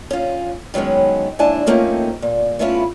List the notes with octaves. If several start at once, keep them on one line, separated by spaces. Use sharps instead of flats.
C#4 F4
D#3 F#3 G#3 B3 C#4
D#2 G#2 D4 E4 G#5 A5
F3 A3 A#3 C4 C#4 D#4
A#2
G3 A3 B3 C#4 E4 F4